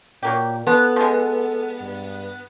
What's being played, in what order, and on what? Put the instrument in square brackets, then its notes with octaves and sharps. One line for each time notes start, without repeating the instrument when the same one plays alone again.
[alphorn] A#2 [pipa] F#3 A#3 G4
[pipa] F3 [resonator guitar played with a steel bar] B3 [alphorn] A4
[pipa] F3 G#3
[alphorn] G2